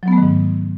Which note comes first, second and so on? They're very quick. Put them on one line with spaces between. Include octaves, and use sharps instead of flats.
F#3 B3 A3 D#3 G#2